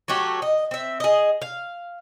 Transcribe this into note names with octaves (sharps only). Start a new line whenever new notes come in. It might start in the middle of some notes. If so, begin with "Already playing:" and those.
F#3 A3 F#4 G4
D#5
C4 E5
G#4 D#5
F5